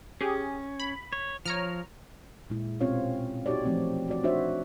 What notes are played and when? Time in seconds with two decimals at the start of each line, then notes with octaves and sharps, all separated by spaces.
0.21 C#4 G4 G#4
0.80 B5
1.13 C#5
1.46 F3 C#5 A#5 F6
2.50 A#2 G#3 E4
2.80 B2 C4 C#4 F4 C#5 F5
3.46 D#4 F#4 G4 C#5 D5
3.65 E3 F3 A3 C4
4.08 F#4 D5
4.24 D4 D#4 F#4 C5 C#5 E5